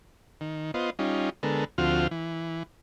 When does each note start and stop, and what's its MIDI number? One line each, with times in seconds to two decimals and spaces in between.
0.41 0.71 51
0.74 0.90 59
0.74 0.90 65
0.74 0.90 72
0.74 0.90 75
0.99 1.30 55
0.99 1.30 61
0.99 1.30 63
0.99 1.30 65
1.43 1.65 50
1.43 1.65 56
1.43 1.65 59
1.43 1.65 69
1.43 1.65 70
1.78 2.07 38
1.78 2.07 53
1.78 2.07 60
1.78 2.07 65
1.78 2.07 66
1.78 2.07 89
2.11 2.63 52